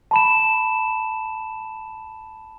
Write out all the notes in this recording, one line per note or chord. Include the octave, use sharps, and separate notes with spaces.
A5 B5 E7